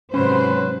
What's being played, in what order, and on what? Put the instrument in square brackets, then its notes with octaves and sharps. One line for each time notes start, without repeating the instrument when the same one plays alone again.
[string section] G#2 C3 F#3 [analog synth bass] C#4 [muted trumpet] B4 [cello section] C5